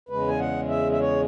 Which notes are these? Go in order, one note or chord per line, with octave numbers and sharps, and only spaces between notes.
E2 C#3 G#3 B4
G#5
F#5
E5
E5
C#5